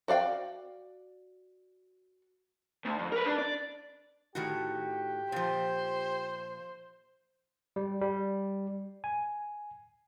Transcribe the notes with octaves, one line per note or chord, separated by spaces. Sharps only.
F#4 D5 F5 G5
D2
F2
A#4 B4
D4
D5
A2 D#3 F#4 G4
A#2 F3 C5
G3
G3
G#5